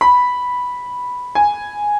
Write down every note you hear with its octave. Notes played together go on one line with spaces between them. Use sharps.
B5
G#5